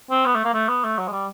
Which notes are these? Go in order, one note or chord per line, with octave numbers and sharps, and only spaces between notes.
C4
B3
A3
A#3
A3
B3
A3
F#3
G#3
G3